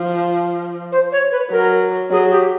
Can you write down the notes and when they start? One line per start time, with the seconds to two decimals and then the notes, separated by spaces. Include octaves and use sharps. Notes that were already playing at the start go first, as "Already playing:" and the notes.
Already playing: F3
0.92 C5
1.12 C#5
1.32 B4
1.51 F#3 A#4
2.11 F#3 G#4
2.31 G4